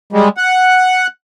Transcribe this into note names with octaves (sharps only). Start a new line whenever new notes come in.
G3 G#3
F#5